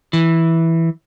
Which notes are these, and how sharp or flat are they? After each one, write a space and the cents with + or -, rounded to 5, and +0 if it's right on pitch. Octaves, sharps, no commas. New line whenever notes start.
E3 -5